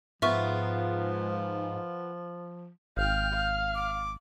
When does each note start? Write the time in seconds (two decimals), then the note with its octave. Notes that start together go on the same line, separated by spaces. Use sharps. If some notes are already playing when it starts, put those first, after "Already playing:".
0.22 G#2 F3 B3 F4 E5 C#6
2.97 G#1 F5 G5 F6 G6
3.33 F5
3.75 D6